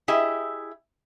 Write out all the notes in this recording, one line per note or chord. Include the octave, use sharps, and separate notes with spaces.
E4 G4 G#4 D#5 E5